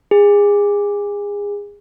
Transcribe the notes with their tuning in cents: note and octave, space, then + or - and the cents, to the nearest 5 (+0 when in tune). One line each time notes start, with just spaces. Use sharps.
G#4 -25